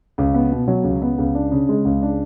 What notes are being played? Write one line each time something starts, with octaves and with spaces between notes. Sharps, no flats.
C#2
B3
B2
F#3
C#2
B3
C#2
D4
C#3
G#3
C#2
D4